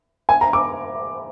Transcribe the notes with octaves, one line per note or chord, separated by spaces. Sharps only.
G#5
A#5
D6